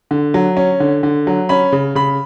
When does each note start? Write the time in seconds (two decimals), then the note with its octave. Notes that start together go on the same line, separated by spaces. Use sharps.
0.11 D3
0.34 F#3
0.57 C#4
0.80 D3
1.03 D3
1.27 F#3
1.49 C#4 B5
1.72 C#3
1.95 C#3 B5